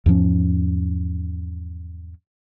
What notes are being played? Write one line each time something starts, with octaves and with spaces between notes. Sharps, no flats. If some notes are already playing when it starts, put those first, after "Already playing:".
E2 G#2 F3 C#4